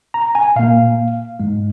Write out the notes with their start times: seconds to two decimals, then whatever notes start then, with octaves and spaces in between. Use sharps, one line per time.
0.14 A#5
0.35 G#5
0.56 A#2 A#3 F5
1.40 G#2 G#3